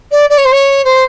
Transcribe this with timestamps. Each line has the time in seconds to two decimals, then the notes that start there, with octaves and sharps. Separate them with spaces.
0.11 D5
0.29 D5
0.37 C#5
0.44 C5
0.52 C#5
0.84 C5